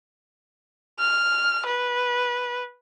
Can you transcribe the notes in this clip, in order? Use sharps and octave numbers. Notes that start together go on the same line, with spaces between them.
F6
B4